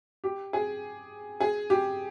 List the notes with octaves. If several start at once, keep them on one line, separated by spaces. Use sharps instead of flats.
G4
G#4
G#4
G4